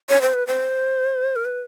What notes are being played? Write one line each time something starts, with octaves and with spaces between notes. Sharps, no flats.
C#5
C5
B4
C5
A#4
B4